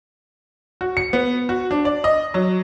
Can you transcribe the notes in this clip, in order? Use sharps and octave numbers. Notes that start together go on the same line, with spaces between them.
F#4
C#7
B3
F#4
D4
D5
D#5
F#3